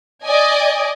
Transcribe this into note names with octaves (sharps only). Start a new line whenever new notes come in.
D5 D#5 G#5